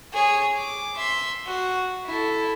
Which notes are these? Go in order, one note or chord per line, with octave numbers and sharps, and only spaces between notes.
G#4 C#5
D6
E5 C6
F#4
E4 A4